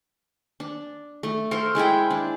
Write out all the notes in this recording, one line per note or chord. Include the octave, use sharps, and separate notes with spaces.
D4
A3
A4 A#4 C5
G#3 E4 G#4 G5
D4